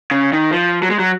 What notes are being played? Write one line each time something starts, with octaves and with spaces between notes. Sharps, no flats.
C#3
D#3
F3
F#3
G#3
F#3